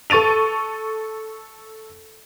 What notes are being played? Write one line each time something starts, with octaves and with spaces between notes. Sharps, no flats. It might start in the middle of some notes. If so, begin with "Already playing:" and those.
A4 C#6 A6 D#7 F7